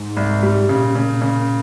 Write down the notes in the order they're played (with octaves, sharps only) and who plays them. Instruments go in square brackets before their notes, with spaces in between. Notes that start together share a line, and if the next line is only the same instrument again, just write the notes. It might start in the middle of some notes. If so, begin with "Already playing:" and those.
Already playing: [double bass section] G#2
[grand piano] C2
G3
[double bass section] A#2 [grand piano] C#3
[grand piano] C#3
C#3